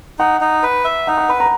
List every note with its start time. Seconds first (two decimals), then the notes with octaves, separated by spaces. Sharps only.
0.19 D#4 F#5
0.41 D#4
0.63 B4
0.84 E5
1.07 D#4 F#5
1.18 F#5
1.29 B4 B5
1.40 A#5